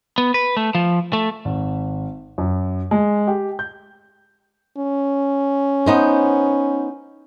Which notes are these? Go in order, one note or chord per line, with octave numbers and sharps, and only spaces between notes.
B3
B4
A3
F3
A3
G#1
F#2
G#3
G4
G6
C#4
B3 D#4 C5